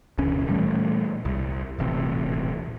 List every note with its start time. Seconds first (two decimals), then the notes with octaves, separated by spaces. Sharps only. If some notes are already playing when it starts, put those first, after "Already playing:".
0.18 E1 D2 C#3 C#4
0.49 A#2 E3 G3 A3
1.25 C2
1.79 D#1 A1 C3